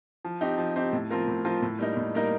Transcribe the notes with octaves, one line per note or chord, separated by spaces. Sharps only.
F3
C4 D#4 G4
F3
C4 D#4 G4
A2
F3 C4 F4 A#4
A2
F3 C4 F4 A#4
A2
G3 A#3 D#4 A#4
A2
G3 A#3 D#4 A#4